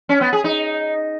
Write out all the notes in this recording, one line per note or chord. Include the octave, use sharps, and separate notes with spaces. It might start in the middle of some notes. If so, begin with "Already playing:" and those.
C#4
B3
G#4
D#4